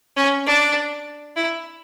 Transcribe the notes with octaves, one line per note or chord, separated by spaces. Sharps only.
C#4
D4
E4